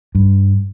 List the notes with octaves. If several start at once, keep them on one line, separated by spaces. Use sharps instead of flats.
G2